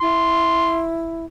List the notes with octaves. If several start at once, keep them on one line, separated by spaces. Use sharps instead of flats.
E4 C6